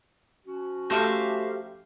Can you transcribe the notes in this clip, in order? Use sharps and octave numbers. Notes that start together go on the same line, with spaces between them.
F3 C#4 F#4
A3 G4 C5 E5 F5 A#5